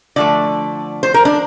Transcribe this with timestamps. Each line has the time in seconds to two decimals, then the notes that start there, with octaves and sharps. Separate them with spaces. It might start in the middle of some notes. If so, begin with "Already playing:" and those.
0.16 D3 F3 A3 D5
1.03 C5
1.14 A#4
1.25 D4